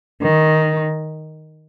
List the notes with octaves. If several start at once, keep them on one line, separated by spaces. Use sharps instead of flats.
D#3